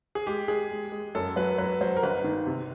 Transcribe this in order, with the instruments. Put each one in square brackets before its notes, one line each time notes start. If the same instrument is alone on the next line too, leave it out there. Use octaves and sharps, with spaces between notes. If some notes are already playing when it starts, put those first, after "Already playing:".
[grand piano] G#4
[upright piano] G#3 [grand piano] G4
[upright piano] G#3 [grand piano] G#4
[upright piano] G#3
G#3
[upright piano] F#2 [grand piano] A4
[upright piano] F#3 [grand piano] B4
[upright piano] F#3 [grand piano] B4
[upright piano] F#3 [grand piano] C5
[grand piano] A#4
[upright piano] G1 [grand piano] B4
[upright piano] D#3
C3